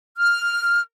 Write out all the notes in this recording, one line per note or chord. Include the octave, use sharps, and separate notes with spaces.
F6